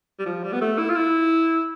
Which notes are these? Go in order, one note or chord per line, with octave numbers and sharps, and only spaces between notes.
G3
F3
G3
B3
A3
E4
F4
E4